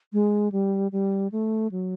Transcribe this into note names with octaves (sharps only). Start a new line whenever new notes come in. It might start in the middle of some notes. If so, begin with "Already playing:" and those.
G#3
G3
G3
A3
F#3